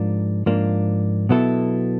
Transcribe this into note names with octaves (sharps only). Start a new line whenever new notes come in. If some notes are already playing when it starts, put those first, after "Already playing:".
Already playing: G#2 F3 A#3 D4
G#2 F3 A#3 D4
B2 F#3 B3 E4 A4